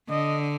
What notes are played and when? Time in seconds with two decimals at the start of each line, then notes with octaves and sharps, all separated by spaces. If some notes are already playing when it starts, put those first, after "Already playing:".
0.09 D3 D#5